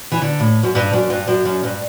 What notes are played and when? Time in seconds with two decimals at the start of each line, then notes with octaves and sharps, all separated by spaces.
0.12 E3
0.22 D3
0.40 A2
0.63 F#2
0.75 G2
0.93 F#2
1.10 G2
1.28 F#2
1.45 F#2
1.64 G2